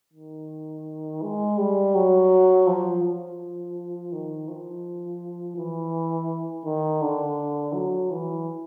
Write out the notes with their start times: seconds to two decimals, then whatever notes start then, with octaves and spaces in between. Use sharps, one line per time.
0.13 D#3
1.22 G#3
1.58 G3
1.95 F#3
2.67 F3
3.03 F3
4.12 D#3
4.48 F3
5.57 E3
6.65 D#3
7.02 D3
7.74 F#3
8.11 E3